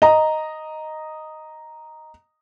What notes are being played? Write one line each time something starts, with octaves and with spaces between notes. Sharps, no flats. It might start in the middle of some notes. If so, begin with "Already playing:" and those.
D#5 A#5